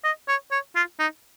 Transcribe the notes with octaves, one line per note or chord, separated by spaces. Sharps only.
D#5
C#5
C#5
F4
D#4